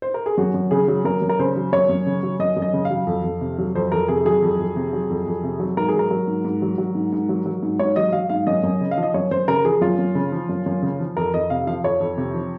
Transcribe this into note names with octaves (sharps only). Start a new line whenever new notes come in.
C5
A#4
G#4
F#2 F#4
F#2
C#3 G#4
F#3
F#2 A#4
F#2
A#4
C#3 C5
F#3
F#2 C#5
F#2
C#3
F#3
F#2 D#5
F#2
D#5
C#3
F5
F#3
F2
F2
C3
F#3
F2 C5
F2 A#4
C3 G#4
F#3 G#4
F2
F2
C3
F#3
F2
F2
C3
F#3
G#2 A#4
G#4
F#3
A#4
F#3
G#2
G#2
F#3
F#3
G#2
G#2
F#3
F#3
G#2
G#2 C#5
F#3 D#5
F#3 F5
G#2 F5
F#2 D#5
F#2
C#3
F5
F3
D#5
F#2 C#5
F#2 C5
C#3 A#4
F3 G#4
F#2 F4
F#2
C#3
F3
F#2
F#2
C#3
F3
F2 A#4
F2 D#5
C3 F5
F3 F5
F2 C#5
F2
C3
F3